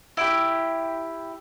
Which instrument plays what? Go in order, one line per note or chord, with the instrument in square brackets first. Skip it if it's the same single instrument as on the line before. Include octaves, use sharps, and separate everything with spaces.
[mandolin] E4 G4